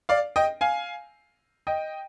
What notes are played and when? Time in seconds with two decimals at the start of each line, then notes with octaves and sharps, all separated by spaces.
0.09 D5 F5
0.36 D#5 G5
0.61 F5 G#5
1.67 D#5 G5